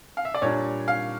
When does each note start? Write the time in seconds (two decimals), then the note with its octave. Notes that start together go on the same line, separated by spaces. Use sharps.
0.17 F5
0.25 E5
0.34 D5
0.42 A#2 G3 D4 C#5
0.88 F5